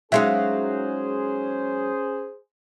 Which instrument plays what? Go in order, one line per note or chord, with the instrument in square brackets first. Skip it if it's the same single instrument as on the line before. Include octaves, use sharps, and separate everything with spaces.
[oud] F#3 G#3 D#4 [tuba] C#4 [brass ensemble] G#4 C5 [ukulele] E5 F5